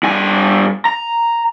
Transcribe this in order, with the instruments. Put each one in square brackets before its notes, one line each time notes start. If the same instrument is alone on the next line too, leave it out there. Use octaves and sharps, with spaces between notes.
[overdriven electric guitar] G2 G#5
A#5